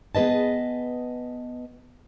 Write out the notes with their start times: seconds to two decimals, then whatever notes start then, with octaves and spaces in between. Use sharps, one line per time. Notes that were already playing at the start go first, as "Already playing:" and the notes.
0.15 B3 G#4 B4 D#5 A5